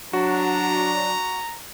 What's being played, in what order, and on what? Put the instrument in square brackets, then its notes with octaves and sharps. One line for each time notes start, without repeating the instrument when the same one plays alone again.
[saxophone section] F#3 D4 [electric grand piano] F#4 [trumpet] A#5